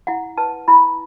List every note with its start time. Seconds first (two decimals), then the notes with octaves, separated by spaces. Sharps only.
0.07 E4 F#5
0.38 B4 A5
0.68 E4 B5